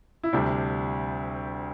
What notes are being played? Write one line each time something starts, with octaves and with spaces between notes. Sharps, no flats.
E4
D2 C3 G3 D4